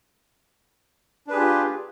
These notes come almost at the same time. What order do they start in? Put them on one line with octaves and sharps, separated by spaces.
D4 B4 G#4 G4 F4